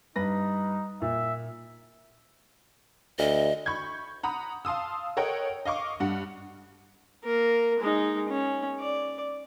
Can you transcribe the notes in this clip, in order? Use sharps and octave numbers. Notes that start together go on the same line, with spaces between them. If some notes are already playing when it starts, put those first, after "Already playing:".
G2 D#4 B4 A#6
A#2 E5
D2 D#5
B5 C#6 G6 G#6
F#5 A#5 B5 D#6
F5 A5 C6 D#6 E6
A4 A#4 C#5 D#5 F#5 G5
D#5 F5 C#6 D6
G2 F#5
A#3 A#4
G#3 D#4
C#4
D5